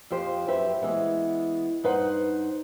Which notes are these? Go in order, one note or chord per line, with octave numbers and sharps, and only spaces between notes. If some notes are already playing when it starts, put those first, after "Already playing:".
F2 F3 G4 C5
F#2 G4 B4 E5
E3 G#3 B3
G2 D#4 B4 C5 F#5